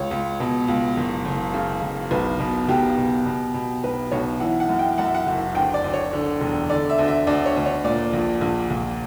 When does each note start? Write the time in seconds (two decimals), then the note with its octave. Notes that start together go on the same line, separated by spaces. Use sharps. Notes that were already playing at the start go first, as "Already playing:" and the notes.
Already playing: C#2 C#5
0.11 C#2
0.40 B2
0.68 C#2
0.97 F#1
1.25 F#1
1.54 C#3
1.82 F#1
2.11 B1 B4
2.40 B2
2.68 B1 G4
2.98 B2
3.26 B2
3.54 B2
3.84 B1 B4
4.11 B1 C#5
4.40 E3 F#5
4.60 F#5
4.69 F#2
4.79 G5
4.98 F#2 F#5
5.06 E5
5.15 F#5
5.27 F#1
5.55 D2 G5
5.74 D5
5.84 D2
5.94 C#5
6.13 D3
6.41 E1
6.70 D3 D5
6.90 E5
6.99 D2
7.08 E5
7.27 D2 D5
7.46 C#5
7.56 D2
7.66 C#5
7.84 A#2 D5
8.13 A#1
8.41 A#1
8.70 A#1